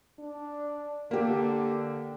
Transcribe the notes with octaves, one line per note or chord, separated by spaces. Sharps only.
D4
D3 A#3 G4